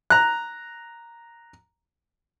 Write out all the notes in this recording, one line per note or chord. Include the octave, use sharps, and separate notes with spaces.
A#5 F#6